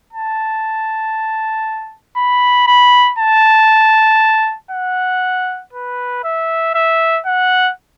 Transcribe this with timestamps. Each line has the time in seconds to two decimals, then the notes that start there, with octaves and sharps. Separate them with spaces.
0.13 A5
2.16 B5
2.67 B5
3.19 A5
4.71 F#5
5.73 B4
6.24 E5
6.75 E5
7.26 F#5